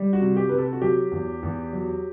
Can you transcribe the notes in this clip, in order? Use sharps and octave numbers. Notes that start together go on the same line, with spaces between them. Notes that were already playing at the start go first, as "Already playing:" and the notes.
Already playing: G3
F#4
C3
G4
C3 B4
A4
F#4
F#3 G4
E2
E2
F#3